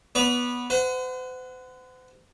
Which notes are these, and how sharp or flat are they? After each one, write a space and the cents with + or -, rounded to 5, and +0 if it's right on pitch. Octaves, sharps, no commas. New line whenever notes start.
B3 -10 D5 -45
C5 -45 F#5 +0